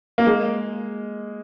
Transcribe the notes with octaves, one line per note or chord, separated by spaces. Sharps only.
A#3
G#3